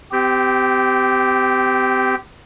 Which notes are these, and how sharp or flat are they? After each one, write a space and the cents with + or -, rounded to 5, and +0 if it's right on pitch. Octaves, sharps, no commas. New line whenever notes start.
C4 -35 G4 -5